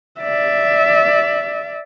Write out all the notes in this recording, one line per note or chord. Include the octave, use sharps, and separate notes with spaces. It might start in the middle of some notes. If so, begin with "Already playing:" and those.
D5 E5